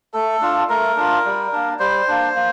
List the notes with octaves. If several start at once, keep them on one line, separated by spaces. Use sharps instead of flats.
A3 A4
D4 F4
A3 A#4
D4 F4
G3
A#3 D4
G3 C5
A#3 D4
A#3